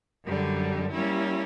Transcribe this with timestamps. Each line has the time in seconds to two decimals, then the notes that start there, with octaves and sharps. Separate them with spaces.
0.24 F#2 D3 G3
0.92 G3 A#3 C#4 E4